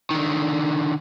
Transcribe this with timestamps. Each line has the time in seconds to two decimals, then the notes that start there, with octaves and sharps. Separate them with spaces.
0.11 D3 D#3